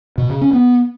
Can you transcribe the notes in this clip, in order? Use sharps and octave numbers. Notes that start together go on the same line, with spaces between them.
B2
C#3
C#4
B3